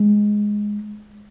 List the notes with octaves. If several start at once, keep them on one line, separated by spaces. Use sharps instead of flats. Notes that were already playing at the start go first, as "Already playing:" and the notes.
Already playing: G#3